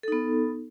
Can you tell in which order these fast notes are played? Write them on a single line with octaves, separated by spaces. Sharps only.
A4 D#4 B3